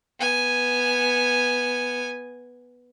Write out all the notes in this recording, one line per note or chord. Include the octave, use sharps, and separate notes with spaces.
B3 G#5